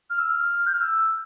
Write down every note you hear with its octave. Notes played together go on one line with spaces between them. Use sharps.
F6
E6
F6
G6
F6
E6